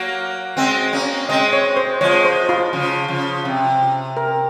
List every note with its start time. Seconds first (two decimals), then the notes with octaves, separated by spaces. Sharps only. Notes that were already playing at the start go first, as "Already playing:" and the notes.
Already playing: F#3 A#3
0.57 G#3 C4
0.93 A#3 C#4
1.29 G#3 C4 D#5
1.53 C#5
1.77 C5
2.01 F3 G#3 C#5
2.25 C5
2.49 F4
2.73 C#3 F3
3.08 C#3 F3
3.45 C3
4.17 A#4